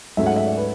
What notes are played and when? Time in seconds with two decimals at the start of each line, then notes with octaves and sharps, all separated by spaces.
0.17 G#2 F#3 A3 C#4 E5
0.26 F#5
0.36 E5
0.47 D5
0.57 B4